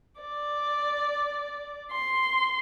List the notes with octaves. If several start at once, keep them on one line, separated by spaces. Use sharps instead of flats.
D5
C6